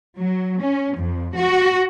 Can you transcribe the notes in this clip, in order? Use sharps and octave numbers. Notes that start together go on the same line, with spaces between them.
F#3
C#4
F2
F#4